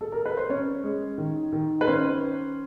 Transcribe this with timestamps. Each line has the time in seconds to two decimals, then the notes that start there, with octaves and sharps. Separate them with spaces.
0.01 A4
0.12 A#4
0.26 B4
0.37 C5
0.50 C#4 C#5
0.84 G#3
1.18 D#3
1.53 D#3
1.81 B4
1.87 C#4 C5